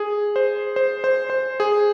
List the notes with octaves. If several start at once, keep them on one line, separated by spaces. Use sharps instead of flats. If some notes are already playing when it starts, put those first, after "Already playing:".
Already playing: G#4
C5
C5
C5
C5
G#4